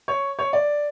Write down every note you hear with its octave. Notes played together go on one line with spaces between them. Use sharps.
C#5
C#5
D5